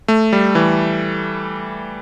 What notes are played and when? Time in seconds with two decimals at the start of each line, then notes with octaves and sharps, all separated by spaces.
0.08 A3
0.33 G3
0.55 E3